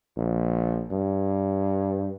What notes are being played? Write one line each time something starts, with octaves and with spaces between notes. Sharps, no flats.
A#1
G2